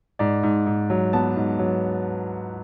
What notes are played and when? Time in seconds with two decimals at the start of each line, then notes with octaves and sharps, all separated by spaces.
0.19 G#2 D5
0.43 G#2
0.66 G#2
0.90 F#3
1.13 B3 A5
1.36 G#2
1.59 F#3